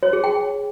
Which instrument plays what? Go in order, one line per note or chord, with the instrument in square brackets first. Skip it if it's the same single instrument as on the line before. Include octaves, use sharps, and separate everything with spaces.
[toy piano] C#5
G#4
G5